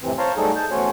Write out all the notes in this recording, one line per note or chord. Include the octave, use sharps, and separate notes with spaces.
F2 A2 C3 E3 C4
C5 C#5 F5 A5 A#5 C6
F#3 G3 A3 D#4 G#4 A4
A5 G6
E2 A3 C#4 F#4 C5 C#5